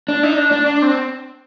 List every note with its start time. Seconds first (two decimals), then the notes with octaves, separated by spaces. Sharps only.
0.08 D4
0.23 D#4
0.37 D4
0.52 D4
0.66 D4
0.82 C4